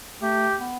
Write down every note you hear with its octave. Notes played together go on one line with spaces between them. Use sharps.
A3 G4
B3